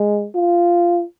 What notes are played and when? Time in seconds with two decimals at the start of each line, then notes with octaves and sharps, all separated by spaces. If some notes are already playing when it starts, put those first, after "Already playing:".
Already playing: G#3
0.35 F4